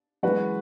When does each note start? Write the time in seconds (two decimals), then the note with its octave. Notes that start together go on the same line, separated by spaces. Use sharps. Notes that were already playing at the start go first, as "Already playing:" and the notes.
0.23 F#2 E3 G#3 F#4 B4